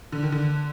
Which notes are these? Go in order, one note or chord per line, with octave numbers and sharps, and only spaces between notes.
D3
D#3
D3